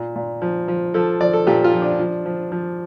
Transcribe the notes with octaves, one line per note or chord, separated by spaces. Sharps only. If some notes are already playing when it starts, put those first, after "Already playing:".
Already playing: A#2
A#2
F3
F3
F3 A4
F3 D5
A4
A#2 G4
F4
F3
D4
F3
F3
F3